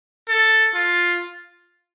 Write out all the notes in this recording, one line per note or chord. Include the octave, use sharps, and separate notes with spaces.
A4
F4